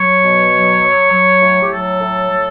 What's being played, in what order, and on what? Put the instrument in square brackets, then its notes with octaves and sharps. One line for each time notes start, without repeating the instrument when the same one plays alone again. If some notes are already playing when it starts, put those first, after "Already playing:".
Already playing: [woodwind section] F#3 C#5
B2
F#3
F#3
F#3
A2
G4
F#3 A4
A2
F#3